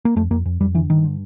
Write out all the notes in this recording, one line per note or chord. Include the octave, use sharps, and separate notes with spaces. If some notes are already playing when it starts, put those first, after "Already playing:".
A#3
F2 A3
F2 A#3
F2
F2 G3
D3 E3
G2 D#3
D3